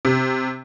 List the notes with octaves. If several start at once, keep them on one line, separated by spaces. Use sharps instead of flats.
C3